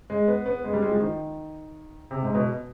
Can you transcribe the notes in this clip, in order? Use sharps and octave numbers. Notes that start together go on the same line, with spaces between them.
G#3
B3
B3
G#3
G3
G#3
F3
D#3
C3
G#2
B2